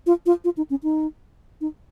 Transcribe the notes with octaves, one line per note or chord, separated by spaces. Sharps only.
F4
F4
F4
D#4
C#4
D#4
D#4